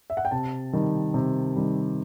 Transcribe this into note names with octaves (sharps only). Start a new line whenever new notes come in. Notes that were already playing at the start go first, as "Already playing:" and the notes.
E5
F#5
G5
C3 A5
D#3 G3
C3
D#3 G3